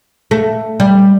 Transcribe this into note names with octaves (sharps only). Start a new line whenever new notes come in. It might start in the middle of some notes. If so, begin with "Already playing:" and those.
A3
G3